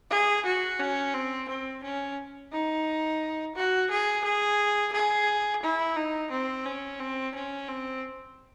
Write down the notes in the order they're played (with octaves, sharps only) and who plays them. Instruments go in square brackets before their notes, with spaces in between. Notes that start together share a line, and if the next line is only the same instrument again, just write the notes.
[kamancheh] G#4
F#4
C#4
C4
C4
C#4
D#4
F#4
G#4
G#4
G#4
E4
D#4
C4
C#4
C4
C#4
C4